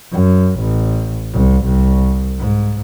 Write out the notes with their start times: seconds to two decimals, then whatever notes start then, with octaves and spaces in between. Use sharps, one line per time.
0.11 F#2
0.59 A1
1.33 C2
1.64 C2
2.39 G#2